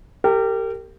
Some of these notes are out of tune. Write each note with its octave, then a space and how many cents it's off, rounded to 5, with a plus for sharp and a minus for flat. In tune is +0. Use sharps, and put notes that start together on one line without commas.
G4 +0 A#4 -35